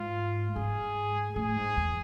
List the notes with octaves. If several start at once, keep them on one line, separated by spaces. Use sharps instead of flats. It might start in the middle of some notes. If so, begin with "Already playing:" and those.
Already playing: G#2 F4
G#2 G#4
A2 G#4
G#2
E2